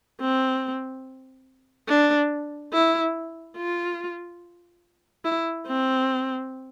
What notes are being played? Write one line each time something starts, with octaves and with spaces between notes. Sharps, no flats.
C4
D4
E4
F4
E4
C4